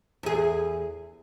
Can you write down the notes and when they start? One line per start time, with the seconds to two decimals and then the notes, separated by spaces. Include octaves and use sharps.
0.23 E2 G#4